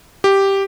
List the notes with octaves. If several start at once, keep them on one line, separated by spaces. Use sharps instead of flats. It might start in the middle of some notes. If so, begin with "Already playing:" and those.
G4